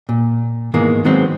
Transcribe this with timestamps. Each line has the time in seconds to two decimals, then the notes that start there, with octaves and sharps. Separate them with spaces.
0.09 A#2
0.74 G#2 B2 D#3 E3 G#3 A#3
1.04 D#3 F#3 G#3 B3 C4